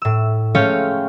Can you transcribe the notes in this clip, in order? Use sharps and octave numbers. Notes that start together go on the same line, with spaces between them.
A2 E6
G#3 A3 C#4 C#5 F5 G5